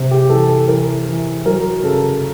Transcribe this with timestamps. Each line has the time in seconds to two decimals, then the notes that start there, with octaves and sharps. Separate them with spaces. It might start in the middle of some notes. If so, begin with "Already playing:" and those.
Already playing: C3
0.11 G4
0.30 E3 A4
0.49 A4
0.68 E3 A#4
1.07 E3
1.45 F#3 A#4
1.83 C#3 A4